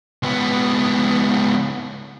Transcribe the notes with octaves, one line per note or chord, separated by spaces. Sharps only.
C#2 B3